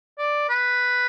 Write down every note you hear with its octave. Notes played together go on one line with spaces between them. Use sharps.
D5
B4